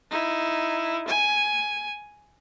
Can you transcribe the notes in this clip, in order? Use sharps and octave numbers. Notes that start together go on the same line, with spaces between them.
D#4 E4
G#5